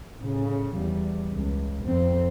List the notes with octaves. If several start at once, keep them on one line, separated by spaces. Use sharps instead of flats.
A2 C#3
E2 G3
C#2
F2 C4